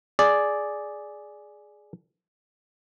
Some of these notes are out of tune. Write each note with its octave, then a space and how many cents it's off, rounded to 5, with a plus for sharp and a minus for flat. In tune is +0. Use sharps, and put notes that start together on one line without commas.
G#4 +10 D5 +0